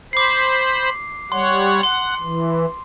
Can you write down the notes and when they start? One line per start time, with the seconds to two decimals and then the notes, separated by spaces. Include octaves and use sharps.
0.13 C5 B5 D6 C7
1.32 G3 C#5 F#5 C6
1.83 F#5 C6
2.22 E3